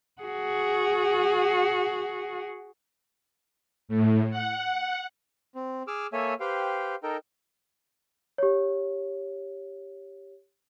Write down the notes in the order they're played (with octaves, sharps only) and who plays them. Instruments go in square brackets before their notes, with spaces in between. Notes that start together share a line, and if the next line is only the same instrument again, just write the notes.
[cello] F#4 G#4
[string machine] A2
F#5
[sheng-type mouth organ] C4
G#4 D6 E6 F6
A#3 A4 C#5 E5 G#5
G4 B4 C5 F5 G5
D#4 A4 A#4 G5
[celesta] G4 C#5